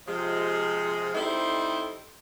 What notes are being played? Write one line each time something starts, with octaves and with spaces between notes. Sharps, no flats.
C3 F3 G#3
G3 C4 D#4 E4 A4 C5